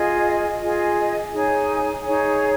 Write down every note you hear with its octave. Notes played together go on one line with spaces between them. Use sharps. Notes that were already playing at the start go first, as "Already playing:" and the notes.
Already playing: F4 G#4 D#5 G#5
F4 G#4 D#5 G#5
D#4 G#4 C#5 G#5
D#4 G#4 C#5 G#5